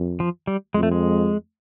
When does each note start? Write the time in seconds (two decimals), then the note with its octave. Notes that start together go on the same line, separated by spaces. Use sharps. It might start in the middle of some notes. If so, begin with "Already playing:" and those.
Already playing: F2
0.20 F3
0.47 G3
0.74 F2 G#3
0.83 A3
0.92 G#3